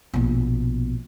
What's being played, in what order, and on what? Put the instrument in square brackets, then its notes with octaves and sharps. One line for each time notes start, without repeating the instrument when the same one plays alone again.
[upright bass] A#1 B2